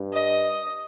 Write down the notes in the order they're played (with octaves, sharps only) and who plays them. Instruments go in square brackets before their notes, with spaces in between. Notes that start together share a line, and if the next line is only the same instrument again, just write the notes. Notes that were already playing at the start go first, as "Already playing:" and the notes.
Already playing: [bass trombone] G2
[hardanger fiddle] D#5